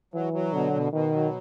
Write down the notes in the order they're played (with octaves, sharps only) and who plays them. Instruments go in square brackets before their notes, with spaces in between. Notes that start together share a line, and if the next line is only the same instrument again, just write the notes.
[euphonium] E3 [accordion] F#3
[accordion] F#3
[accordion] B2 [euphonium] D3
[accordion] B2
[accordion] B2 [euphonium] D#3
[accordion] F#3